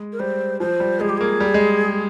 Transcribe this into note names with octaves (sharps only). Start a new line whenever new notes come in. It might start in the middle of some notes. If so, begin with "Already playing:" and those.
Already playing: G#3
A#4
G3 C5
F3 C5
G3
G#3 G#4
G4
A#3 G#4
G3
G#3